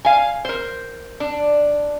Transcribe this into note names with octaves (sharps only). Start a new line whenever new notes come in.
F5 G#5
A#4 C5
D4